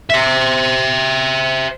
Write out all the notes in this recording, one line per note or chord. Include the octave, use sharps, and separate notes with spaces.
C5 E5